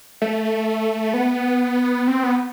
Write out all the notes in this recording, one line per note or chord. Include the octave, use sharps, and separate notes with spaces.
A3
B3
C4
B3